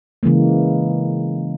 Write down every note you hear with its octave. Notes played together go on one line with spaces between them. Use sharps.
C#3 E3 G#3 A#3